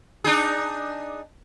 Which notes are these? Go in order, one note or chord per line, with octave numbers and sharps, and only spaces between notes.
D4 D#4 G#4